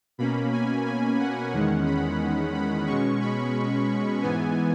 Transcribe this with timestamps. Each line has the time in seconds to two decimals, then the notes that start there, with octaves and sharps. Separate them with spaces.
0.18 B2 A#3 C#4 B5
0.52 G#5
0.86 G#5
1.20 F#5
1.53 E2 D#3 G#3 C#4
1.86 B5
2.54 B5
2.87 B2 G#3 C#4 C#6
3.21 B5
4.22 G#2 E3 B3 G#5